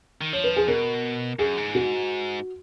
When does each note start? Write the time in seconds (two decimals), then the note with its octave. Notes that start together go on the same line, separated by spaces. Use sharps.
0.21 D#3
0.33 F3 C#5
0.44 B4
0.56 G#4
0.67 B2 A#4
1.39 F#2 G#4
1.57 G#2
1.75 F#4